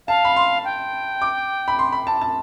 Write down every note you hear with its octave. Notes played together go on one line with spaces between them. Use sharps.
F5 A5
B5
C6
G5
D6
B5
C6
B5
A5
A5